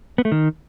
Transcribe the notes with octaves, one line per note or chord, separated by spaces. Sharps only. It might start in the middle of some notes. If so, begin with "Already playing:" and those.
B3
A3
D#3